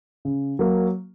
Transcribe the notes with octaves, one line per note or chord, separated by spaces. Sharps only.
C#3
F#3 A#3